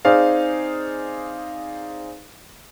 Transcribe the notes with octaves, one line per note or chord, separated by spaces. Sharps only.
C4 D#4 G#4 C5 D5 F5